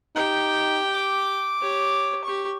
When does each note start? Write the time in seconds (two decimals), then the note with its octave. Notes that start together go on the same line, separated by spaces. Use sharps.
0.16 D#4 G4 G5
0.95 D6
1.61 G4 C#5
2.24 G4 C#6